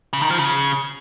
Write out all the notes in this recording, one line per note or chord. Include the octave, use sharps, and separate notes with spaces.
C#3
D#3
F3
C#3